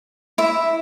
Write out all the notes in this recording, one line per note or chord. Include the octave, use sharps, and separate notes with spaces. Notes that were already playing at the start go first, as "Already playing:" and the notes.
E4 E5